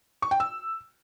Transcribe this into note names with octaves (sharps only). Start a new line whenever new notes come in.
C#6
G5
E6